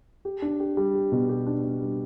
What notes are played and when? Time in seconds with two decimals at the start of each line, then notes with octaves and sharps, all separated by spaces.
0.25 G4
0.42 D4
0.60 G4
0.77 G3
0.95 G4
1.12 B2
1.29 G4
1.47 D4
1.64 D4
1.81 G3